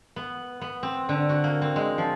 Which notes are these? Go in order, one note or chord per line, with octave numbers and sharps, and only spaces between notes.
B3
B3
C4
D3
F#4
A#3
C4
G#3
F3